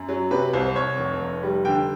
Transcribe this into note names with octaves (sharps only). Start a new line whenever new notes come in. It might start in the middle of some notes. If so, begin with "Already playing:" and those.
Already playing: F#2
F#3
C3 B4
C2 C5
C2 C#5
F1
F1
G3
D3 G5